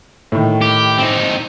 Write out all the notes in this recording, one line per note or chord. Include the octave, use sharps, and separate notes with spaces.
A2 D#3
G4
C4 D#4